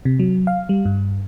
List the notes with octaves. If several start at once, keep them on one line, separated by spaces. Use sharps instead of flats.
C3
F#3
F5
G3
G2